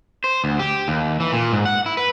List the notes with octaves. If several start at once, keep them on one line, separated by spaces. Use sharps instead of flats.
C5
D2
G4
D#2
E3
A#2
G#2
F#5
E4
B4